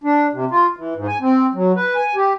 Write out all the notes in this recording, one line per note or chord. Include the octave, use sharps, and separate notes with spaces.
D4
C3
F4
E3
G#2
G#5
C4
F#3
B4
G#5
G4